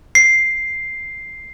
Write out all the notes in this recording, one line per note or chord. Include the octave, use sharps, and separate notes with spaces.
C7